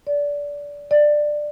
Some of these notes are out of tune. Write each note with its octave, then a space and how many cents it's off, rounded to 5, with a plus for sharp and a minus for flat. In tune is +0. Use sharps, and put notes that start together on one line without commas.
D5 -20
D5 +15